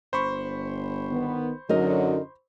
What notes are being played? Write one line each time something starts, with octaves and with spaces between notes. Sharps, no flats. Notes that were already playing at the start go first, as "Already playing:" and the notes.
G1 C5 B5 C#6
D#3 B3
F#2 D3 F#3 D#4 A#4 D#5